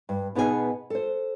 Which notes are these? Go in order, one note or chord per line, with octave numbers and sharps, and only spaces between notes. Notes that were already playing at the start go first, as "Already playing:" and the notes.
G2
B2 B3 D#4 G#4 C5 G#5
A4 C5